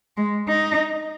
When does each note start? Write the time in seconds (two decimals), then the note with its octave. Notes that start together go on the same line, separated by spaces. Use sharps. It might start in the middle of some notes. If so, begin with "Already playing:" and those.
0.17 G#3
0.48 D#4